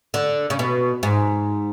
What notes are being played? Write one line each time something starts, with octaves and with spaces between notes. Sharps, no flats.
D3
C#3
B2
G#2